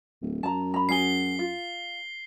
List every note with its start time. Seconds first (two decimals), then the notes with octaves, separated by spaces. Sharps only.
0.22 D1
0.43 F#2 A5 A#5
0.74 A#5 B5
0.89 C#4 F#4 G#4 C7 G7
1.39 F4